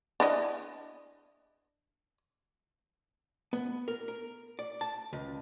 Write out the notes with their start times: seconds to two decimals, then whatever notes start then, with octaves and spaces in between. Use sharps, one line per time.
0.20 D4 E4 D#5
3.53 B3
3.88 A#4
4.08 A#4
4.59 D5
4.81 A5
5.13 C#2